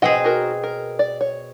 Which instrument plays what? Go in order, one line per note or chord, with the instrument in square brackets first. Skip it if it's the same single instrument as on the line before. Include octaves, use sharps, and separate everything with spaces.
[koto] B2 C4 G#4 [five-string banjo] D#5 F#5 G5
[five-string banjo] D#4 F#4 A#4
A#4
D5
C#5